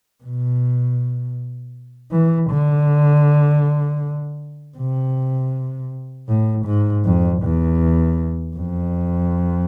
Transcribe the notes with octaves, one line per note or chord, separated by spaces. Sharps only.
B2
E3
D3
C3
A2
G#2
F2
E2
F2